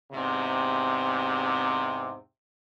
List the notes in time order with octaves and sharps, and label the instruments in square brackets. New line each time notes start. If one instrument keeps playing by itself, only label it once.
[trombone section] E2 G#2 C3